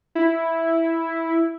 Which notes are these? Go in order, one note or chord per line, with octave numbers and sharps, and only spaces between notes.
E4